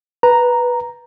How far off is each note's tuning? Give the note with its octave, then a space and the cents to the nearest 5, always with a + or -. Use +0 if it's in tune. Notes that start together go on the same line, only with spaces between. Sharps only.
B4 -5 A#5 +0